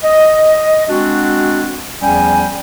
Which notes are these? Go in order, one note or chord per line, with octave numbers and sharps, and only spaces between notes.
D#5
G#3 C4 D4 F#4
E2 F3 G3 C#4 G5 G#5